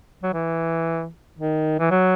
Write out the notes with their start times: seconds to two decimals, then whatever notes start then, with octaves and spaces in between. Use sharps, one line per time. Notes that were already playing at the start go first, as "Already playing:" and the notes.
0.23 F#3
0.33 E3
1.39 D#3
1.80 E3
1.91 F#3